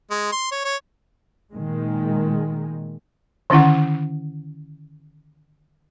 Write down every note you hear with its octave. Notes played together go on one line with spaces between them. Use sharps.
G#3
C6
C#5
C#5
A#2 D#3 G#3
D3 D#3 C#4 E4 F#5